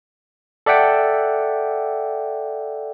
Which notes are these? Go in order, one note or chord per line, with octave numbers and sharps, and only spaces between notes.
A4 D5 E5 F#5 G5